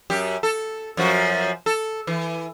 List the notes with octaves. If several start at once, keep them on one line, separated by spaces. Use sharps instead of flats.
F#2 G4
A4
F#2 F3 F#4
A4
E3